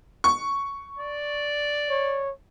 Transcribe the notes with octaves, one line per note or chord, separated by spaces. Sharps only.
C#6
D5
C#5